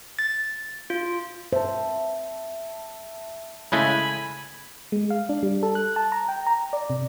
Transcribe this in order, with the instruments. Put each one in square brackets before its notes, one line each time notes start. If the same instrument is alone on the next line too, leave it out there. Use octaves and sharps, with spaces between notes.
[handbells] A6
F4
[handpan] C5 [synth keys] E5 A5
[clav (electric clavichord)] C#3 G#3 A3 [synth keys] E4 [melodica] G#5 B5
[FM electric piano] G#3
F5
D4
G3
A4
F#6
A5
A#5
G5
A#5
D5
C3